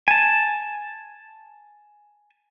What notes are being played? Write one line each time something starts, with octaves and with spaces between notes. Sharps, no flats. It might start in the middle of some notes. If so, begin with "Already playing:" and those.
G#5 A5